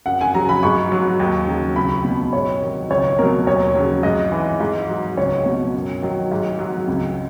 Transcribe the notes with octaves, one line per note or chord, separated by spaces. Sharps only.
F#2 F#5
G#5
C#3 F#3 A#5
B5
G#2 C#6
F#3
D#2
C#3 F#3
C#2 B5
B2 F#3
G#2 C#5
D#3 F#3
C#2 C#5
B2 F#3 A#4
D#2 C#5
C#3 F#3
G#2 D#5
E3
G#2
F#3
C#2 C#5
B2 F#3
F#2
D#3 F#3
G#2
F#3
C#2